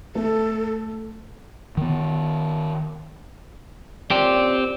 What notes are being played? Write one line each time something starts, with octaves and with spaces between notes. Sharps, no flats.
A3 A4
D#3 B3
A#2 C4 C#4 G4 D5